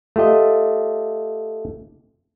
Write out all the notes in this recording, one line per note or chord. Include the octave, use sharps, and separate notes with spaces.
A3 F4 G4 D#5